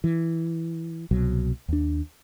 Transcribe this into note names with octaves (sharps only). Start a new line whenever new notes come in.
E3
C2 B2 F#3
D#2 D4